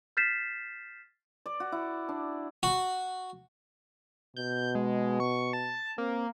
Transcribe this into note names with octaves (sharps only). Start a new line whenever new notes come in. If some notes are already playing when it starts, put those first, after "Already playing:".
F6 G6 A6 B6 C7 E7
D5
F#4
E4
D4
F#4
B2 G6
G#3
C#6
A5
A#3 C4